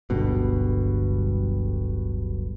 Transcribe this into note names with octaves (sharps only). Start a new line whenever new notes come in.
D1 G1 G2 B2